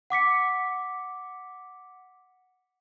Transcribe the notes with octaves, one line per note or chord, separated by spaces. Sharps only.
F#5 D6 B6 C#7